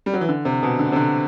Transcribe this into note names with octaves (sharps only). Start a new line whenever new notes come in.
G3
F#3
E3
D3
C3
B2
D3
C3
D3